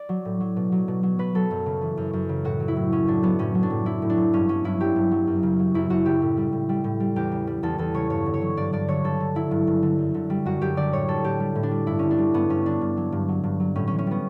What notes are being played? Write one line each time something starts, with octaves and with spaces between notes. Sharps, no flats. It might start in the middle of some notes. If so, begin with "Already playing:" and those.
Already playing: D5
F#3
A2
F#3
B2
F#3
B2
F#3
B2 B4
F#3 A4
F#2
C#3
E3
F#2
F#2
C#3
A2 F#4
F#3
E4
A2
F#3 C#4
A2 D4
F#3 B3
A2 C#4
F#3
D4
A2
F#3 E4
A2
D4
F#3
G2 C#4
F#3 C#4
G2 E4
F#3 G4
G2
F#3
F#2
C#3
F#3
F#2 E4
F#2 F#4
C#3 G4
A2
G3
A2
G3
A2
G3
E2 G4
C#3
G3
E2 A4
E2 A4
C#3 C#5
G2 C#5
D3
C#5
F#3
G2 D5
G2 D5
D3 C#5
G2 A4
D3
F#3 E4
G2
G2
D3
F#2
D3
G3
F#2 F#4
F#2 G4
D3 D5
A2 C#5
G3 A4
A2 G4
G3
A2
D4
G3
G2 E4
D3 C#4
D4
G3
G2 B3
G2 C#4
D3 D4
G2
F#3
G2
F#3
G2
F#3
A2 C#4
E3 C#4
C#4
G3 B3